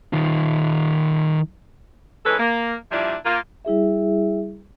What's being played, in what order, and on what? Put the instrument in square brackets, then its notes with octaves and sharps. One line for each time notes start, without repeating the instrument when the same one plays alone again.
[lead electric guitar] D#3 F4
[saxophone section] E3 G#3 C#4 D#4 A4 B4
A#3
A#2 F3 G3 D4 E4
A#3 F4
[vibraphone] G3 E4 G#4 E5